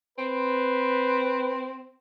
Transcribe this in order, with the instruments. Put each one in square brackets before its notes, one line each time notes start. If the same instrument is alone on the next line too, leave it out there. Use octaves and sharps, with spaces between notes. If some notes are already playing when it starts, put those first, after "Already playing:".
[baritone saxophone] C4 [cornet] B4